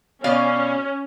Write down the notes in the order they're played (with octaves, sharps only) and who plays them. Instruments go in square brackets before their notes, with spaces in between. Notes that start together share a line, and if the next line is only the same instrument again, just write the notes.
[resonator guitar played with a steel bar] B2 D5 F5 [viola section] C#4